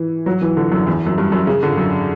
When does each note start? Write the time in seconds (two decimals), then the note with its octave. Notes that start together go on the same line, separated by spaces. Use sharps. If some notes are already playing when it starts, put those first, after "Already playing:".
Already playing: E3
0.26 F#3
0.42 E3
0.57 D3
0.72 F#2
0.87 E2
1.07 F#2
1.18 G2
1.32 F#2
1.47 C#3
1.63 D3
1.77 F#2